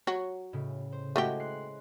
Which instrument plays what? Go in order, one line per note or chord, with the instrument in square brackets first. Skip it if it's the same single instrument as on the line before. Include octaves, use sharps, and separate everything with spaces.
[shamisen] F#3 F#4 C#5
[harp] A2 C#3
C5
[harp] G#3 E4 [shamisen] A3 F#4 G4
[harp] C6 F#6 C7